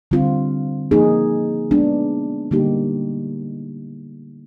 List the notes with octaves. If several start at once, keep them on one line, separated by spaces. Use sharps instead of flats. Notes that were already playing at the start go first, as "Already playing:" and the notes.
D3 G3 C4 F4
F3 A#3 D#4 G#4
G#3 B3 D4
D3 G3 A#3 D#4 G4